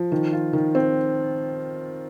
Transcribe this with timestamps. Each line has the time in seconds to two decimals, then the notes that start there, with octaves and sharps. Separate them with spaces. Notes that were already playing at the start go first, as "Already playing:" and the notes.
Already playing: F3
0.12 D#3
0.33 F4
0.53 D#3
0.75 C4